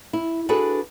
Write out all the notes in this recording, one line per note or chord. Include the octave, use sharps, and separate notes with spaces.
E4
D4 F#4 G#4 A4 B4